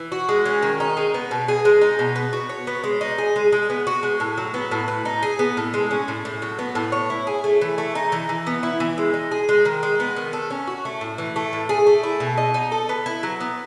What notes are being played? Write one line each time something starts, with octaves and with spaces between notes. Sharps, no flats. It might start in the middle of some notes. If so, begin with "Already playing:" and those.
Already playing: E3
F#4
G#3
C#4
D#3
D#4
G#3
B3
B2
G#4
G#3
D#4
B2
B3
F#4
C#5
B3
G#3
D#4
G#4
G#3
G#3
B3
F#4
G#3
A2
F#3
B3
A2
B4
D#4
G#4
B3
A2
G#3
C#4
A2
A2
F#3
B3
A2
C#5
E4
G#4
A3
E3
A3
D#4
E3
E3
B3
E4
E3
G#3
D#4
G#4
G#3
D#3
G#3
B3
D#3
A4
C#4
F#4
A3
A2
E3
A3
A2
G#4
A3
E4
B2
D#5
D#4
A4
B3
E4
F#3
B3